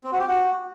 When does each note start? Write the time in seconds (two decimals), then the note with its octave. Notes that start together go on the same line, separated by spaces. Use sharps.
0.04 C4
0.12 F#4
0.19 G4
0.27 F#4